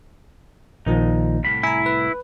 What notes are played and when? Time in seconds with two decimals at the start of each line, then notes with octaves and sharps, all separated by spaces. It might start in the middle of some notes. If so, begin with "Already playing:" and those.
0.86 A#1 A#2 D#3 F3 D#4
1.44 C2 A2 B5
1.63 E4 G#5 A#5
1.86 B4